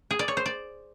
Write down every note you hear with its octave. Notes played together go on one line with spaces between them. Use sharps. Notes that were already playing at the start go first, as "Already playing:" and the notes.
G#4
D5
C#5
C5
D5